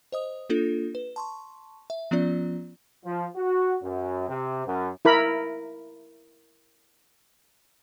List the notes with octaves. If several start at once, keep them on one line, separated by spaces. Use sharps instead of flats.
C5 D#5 D#6
A#3 D4 F4 A4
B4
A5 C6 C#6
E5
F3 B3 C#4 F4 D5
F3
F#4
F#2
C3
F#2
E4 A#4 B5